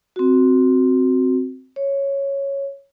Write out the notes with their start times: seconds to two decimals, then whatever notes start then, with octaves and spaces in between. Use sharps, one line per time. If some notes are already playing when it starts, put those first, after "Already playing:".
0.16 C4 F#4
1.76 C#5